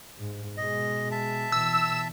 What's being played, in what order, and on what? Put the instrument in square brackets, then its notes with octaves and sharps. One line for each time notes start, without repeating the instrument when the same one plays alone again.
[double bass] G#2
[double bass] B2 G#3 [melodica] D#5
[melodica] E5 A5
[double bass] B2 E3 [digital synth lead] E6